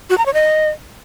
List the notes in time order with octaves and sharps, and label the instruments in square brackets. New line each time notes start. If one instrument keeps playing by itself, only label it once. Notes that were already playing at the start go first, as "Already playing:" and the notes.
[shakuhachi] F#4
A#5
C#5
D#5